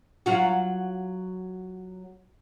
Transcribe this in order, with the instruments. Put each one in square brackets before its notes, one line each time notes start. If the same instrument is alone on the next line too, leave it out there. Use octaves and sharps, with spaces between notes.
[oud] F#3 F4 F#4